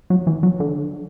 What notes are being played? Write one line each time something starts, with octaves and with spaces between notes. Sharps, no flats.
F#3
E3
F#3
D3